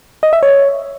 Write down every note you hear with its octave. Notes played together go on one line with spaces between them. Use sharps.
D#5
E5
C#5